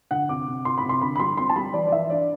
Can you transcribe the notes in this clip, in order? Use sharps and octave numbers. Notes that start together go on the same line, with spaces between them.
D3 F#5
C3 D6
C3
C3 C6
B5
C3
C6
D3 B5
B5
G3 C6
C4 C6
A5
G3 B5
E3 D5
D5
E3 E5
D4 D5